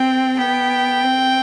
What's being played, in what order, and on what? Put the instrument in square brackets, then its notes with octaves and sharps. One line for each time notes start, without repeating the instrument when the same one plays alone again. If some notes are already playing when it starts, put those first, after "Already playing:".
Already playing: [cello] C4 [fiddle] G5
[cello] B3 [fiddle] G5
[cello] C4